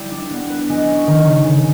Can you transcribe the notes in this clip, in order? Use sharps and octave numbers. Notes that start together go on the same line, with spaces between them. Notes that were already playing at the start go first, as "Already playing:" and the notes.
Already playing: G3 E4
D4
B3
B4
G#3
C#4
D#3
C#3
C#3